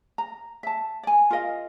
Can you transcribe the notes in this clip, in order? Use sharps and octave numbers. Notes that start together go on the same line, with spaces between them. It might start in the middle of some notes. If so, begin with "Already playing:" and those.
A#5
E5 A5
D5 G#5
F4 A#4 D#5 F5